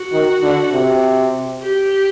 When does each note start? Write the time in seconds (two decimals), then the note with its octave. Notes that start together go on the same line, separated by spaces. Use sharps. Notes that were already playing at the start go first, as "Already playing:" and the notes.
Already playing: F#4
0.12 D#3
0.42 D3
0.72 C3
1.62 G4